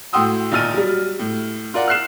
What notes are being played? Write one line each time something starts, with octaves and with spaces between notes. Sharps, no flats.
A2 F#4 G5 C6 D#6 E6
D#2 A#2 D#4 F6 A6 D#7
F#3 G3
A2
F4 A#4 D5 F#5
F6 F#6 C7 E7